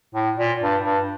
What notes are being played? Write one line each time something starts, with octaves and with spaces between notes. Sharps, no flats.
A2
A#2
G2
G2